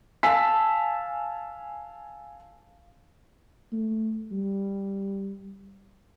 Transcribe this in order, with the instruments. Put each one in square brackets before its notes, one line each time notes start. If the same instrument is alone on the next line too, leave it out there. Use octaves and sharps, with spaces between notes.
[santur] F5 A5 [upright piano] G#5 E6 B6
[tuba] A3
G3